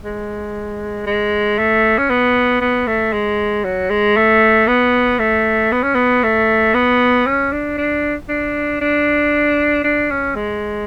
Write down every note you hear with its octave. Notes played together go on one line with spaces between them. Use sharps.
G#3
G#3
A3
C#4
B3
B3
A3
G#3
F#3
G#3
A3
B3
A3
B3
C#4
B3
A3
B3
C#4
D4
D4
D4
D4
D4
C#4
G#3